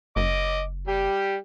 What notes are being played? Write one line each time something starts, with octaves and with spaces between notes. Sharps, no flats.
F#1 D#5 D6
G3 G4